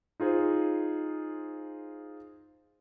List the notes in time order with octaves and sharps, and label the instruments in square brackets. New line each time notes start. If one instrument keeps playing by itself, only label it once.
[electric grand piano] D#4 F4 G#4 C5